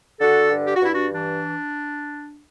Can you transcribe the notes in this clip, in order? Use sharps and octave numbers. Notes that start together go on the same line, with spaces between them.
D3 F#4 A4
G2
G4
F#4
G2 E4
D4 F#4
E3 D4